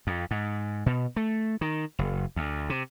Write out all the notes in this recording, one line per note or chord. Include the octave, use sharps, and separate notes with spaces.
F2
G#2
B2
A3
D#3
F#1
D2
C3